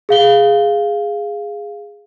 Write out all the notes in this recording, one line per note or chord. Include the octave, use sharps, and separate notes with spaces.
G#4 F5 G7